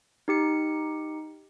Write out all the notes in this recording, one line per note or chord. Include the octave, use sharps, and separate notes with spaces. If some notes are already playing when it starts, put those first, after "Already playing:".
D#4 G4 C#7